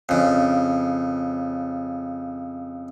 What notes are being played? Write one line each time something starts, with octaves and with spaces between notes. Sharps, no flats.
F2 C#3